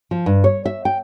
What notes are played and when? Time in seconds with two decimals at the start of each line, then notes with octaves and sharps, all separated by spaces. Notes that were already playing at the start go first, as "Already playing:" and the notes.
0.11 F3
0.26 G2
0.44 C#5
0.66 E5
0.85 G5